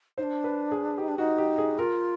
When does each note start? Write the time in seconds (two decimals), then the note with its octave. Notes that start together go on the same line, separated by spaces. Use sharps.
0.18 D#4 C5
0.23 D4
0.44 B4
0.72 G#4
0.98 D#4 G4
1.08 D4
1.18 D#4 F#4
1.38 G4
1.58 G#4
1.78 F4 A#4